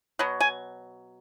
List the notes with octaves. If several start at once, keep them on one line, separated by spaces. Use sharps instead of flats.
B2 F#3
G#5